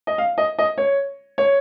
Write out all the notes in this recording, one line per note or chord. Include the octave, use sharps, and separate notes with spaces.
D#5
F5
D#5
D#5
C#5
C#5